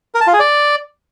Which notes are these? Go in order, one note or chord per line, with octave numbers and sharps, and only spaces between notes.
A#4
A5
F4
G#4
D5